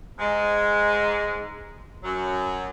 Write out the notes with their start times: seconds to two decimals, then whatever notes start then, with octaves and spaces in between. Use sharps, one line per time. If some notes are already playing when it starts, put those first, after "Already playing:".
0.18 G#2 G#3
2.02 F#2 F#3